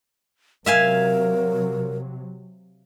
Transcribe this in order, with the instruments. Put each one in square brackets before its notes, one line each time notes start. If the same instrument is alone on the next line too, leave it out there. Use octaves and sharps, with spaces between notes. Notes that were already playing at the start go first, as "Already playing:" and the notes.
[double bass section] C3 F#3 [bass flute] A#4 [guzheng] E5 F5 G#5